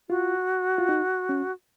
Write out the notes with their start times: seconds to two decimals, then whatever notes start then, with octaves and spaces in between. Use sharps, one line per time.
0.09 F4 F#4
0.78 F4
0.89 D#4
1.29 C#4